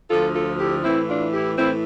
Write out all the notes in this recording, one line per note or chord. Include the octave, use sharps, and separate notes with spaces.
D2 D3 F3 F4 A4
F4 A4
E4 G4
A2 E3 C4 E4
D4 F4
E4 G4
A2 E3 C4 E4